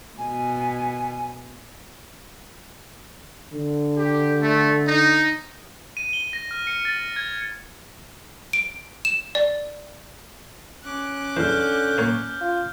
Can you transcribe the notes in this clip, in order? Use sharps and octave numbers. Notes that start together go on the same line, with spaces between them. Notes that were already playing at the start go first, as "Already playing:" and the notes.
B2 G#5
D3
G4
A3
D#4
D#7
G7
A#6
F6
C#7
A6
G#6
D7
E7
D5
C#4 D6 F#6
E2 D3 F6 G6
A#3 C#5
F4